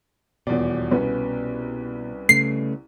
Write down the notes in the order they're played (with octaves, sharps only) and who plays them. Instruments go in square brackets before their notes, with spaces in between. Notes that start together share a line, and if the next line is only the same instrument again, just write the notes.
[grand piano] D#1 E2 D5 [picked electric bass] B2
[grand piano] C2 B3 C#4
[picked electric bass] C#3 A3 [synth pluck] C7